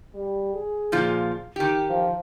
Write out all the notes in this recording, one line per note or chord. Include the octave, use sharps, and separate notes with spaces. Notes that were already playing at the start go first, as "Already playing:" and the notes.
G3
G#4
A#2 F3 F4
D#3 G4
F3